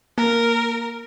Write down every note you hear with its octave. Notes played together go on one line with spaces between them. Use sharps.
A#3 A#4